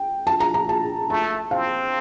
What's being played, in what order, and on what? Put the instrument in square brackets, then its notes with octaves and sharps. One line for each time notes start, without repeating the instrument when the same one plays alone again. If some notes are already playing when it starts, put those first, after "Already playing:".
Already playing: [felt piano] G5
A5
A#5
A#5
A5
[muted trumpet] A3 [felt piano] A5
[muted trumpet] C4 [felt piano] F5